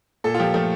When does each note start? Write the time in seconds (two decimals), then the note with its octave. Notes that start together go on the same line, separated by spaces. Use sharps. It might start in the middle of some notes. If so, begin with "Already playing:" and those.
0.24 A#2 A4
0.34 F4
0.39 F3 G4
0.54 F3 A3